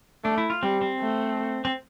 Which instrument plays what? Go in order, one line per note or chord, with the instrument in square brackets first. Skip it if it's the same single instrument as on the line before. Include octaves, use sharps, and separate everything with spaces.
[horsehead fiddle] A3 [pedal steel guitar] D4
[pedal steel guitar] E4
F4
[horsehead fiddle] G3 [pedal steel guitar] C4
[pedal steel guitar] C4
[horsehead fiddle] A3
[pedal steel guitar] C4